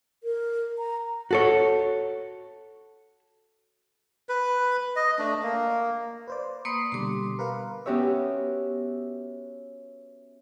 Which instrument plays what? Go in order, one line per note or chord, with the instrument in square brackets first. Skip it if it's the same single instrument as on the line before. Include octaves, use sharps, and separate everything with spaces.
[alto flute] A#4
A#5
[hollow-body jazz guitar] F#4 A4 C#5
[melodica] B4
D#5
A3 D4
A#3
[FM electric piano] B4 C5 D5
[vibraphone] A#3 C6 D#6 [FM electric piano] B5 C7 C#7
[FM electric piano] B2 D3 G3 [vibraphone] C6 D6
[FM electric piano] A#4 B4 F5
[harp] B3 C#4 F#4 G4 C#5 E5